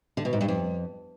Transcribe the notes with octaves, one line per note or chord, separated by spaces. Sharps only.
D3
B2
G#2
G2
F2